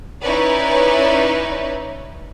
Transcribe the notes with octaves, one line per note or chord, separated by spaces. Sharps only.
C#4 D#4 E4 B4 C#5 D5